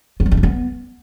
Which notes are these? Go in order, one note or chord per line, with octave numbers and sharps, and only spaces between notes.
B3
F#3
C#4
D4
B3